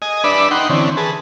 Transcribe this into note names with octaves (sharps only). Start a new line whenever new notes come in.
D#5 G#5
D4 B4 D5 E5 B5
D#4 F#5 G5 C6
D3 E3 C4 C#4
G#4 B4 A5